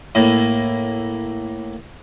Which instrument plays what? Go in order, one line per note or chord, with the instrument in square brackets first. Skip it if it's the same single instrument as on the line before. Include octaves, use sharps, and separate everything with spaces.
[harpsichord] A2 A#3